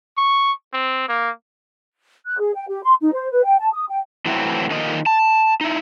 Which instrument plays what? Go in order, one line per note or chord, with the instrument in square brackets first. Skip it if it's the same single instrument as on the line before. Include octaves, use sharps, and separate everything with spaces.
[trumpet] C#6
C4
A#3
[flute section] F#6
G#4
G5
G4
C6
D#4
C5
B4
G5
A5
D#6
G5
[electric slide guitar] A2 E3 F#3 C4 E4
D3 D#3 F3 A#3 D#4 D#5
A5
D#4 E4